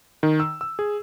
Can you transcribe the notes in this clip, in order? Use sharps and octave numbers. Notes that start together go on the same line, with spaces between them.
D#3
E6
E6
G#4